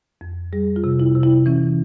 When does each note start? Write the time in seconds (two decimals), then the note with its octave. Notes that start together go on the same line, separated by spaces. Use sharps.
0.21 F2
0.53 G3 G#4
0.76 F4
0.84 C3
1.00 E4
1.15 C3
1.23 E4
1.46 E3 C#4